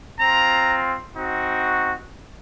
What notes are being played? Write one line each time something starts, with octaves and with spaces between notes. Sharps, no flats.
C4 F4 A#5
C4 D#4 F#4